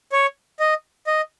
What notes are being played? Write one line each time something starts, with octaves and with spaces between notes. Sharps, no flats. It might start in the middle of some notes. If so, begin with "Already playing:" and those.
C#5
D#5
D#5